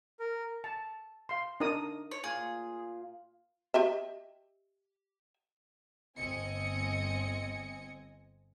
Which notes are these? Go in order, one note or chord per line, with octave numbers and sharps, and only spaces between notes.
A#4
A5
F5 C6
D4 D#4 A#4 D#6
C#5
A#2 F4 G#4 F5
G4 D#5 E5
G1 C4 D#5 G#5 C#7